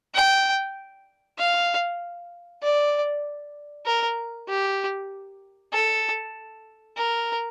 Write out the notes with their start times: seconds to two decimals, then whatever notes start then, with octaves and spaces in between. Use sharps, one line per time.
0.14 G5
1.39 F5
2.63 D5
3.86 A#4
4.48 G4
5.73 A4
6.97 A#4